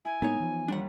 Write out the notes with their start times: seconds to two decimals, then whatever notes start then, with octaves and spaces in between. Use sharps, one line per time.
0.05 E4 G#5
0.22 A2 G#3 A#3 B3 D#4 C#5
0.40 E3 F3
0.68 D#2 G3 D4 F#5